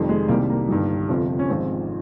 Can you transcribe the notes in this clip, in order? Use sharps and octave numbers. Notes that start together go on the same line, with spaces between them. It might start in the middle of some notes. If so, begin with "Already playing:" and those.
Already playing: F1 F2 D#3 G3
G#3
C2 C3 D#3 G3 A#3
A#3
G1 G2 D#3 G3
G1 F2 C3 F3
C#4
G#1 G#2 F3 C4